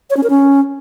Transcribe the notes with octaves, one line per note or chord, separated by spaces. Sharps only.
C#5
C#4
A#4
C#4